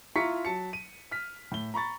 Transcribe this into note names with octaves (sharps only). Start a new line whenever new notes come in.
E4 F4 A#5 C#6 B6 C#7
F#3 A5 C#7
D#7
F6 B6
A2 G7
A#5 B5 C#6 A6